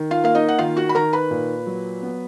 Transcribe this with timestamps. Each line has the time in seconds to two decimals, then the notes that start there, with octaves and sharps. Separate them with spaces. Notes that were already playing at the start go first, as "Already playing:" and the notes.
Already playing: D#3
0.11 F4 F5
0.24 A#3 F5
0.35 D#4 D#5
0.49 F#5
0.59 D#3 F4 F5
0.77 F#4 F#5
0.89 B5
0.95 D#3 A#4 A#5
1.13 B4 B5
1.31 A#2
1.67 F#3
2.03 B3